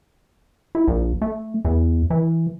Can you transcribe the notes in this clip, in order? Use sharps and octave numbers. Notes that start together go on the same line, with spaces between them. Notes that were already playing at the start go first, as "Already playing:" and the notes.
E4
A#1
A3
E2
E3